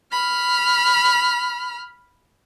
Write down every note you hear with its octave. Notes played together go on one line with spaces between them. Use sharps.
B5 F6